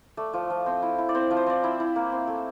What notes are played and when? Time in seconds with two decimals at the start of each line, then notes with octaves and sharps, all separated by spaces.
0.17 A3 D5
0.33 F3
0.50 F3
0.66 C4
0.82 E4
0.98 E4
1.09 D5
1.15 C4 C5
1.31 F3
1.37 C5
1.47 C4 D5
1.64 E4 E5
1.80 E4
1.96 A#3
2.12 C4
2.27 A3